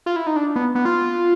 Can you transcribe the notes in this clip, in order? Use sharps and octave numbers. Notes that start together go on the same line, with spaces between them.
F4
E4
D#4
D4
B3
B3
F4